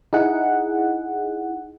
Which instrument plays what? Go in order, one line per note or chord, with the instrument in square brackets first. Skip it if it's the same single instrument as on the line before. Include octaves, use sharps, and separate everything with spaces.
[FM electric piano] D#4 E4 G#4 F#5